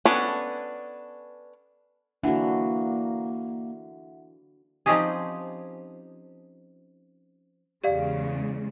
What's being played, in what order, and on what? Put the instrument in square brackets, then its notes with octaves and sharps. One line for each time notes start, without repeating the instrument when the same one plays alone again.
[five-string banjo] B3 C#4 D4 A4 B4
[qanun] D3 E3 [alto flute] A#3 [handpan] D4 F#4 [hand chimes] E5 F#5
[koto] F3 C4 C#4 D#4 G4 G#4
[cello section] E2 C#3 G#3 [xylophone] G4 D5 F5